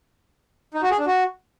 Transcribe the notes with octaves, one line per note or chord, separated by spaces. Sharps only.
D#4
F#4
G#4
D4
F#4